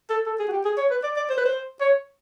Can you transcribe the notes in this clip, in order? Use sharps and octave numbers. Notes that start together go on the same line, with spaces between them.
A4
A4
G#4
F#4
G4
G#4
C#5
B4
D5
D5
C5
B4
C5
C#5